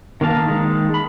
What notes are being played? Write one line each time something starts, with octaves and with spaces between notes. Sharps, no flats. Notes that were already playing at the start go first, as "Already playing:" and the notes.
D#3 A#3 F5 A5
D#3 G#3
B5